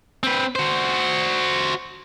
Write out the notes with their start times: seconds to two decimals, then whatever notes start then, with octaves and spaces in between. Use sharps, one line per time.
0.23 C4 B4
0.56 F#4 C5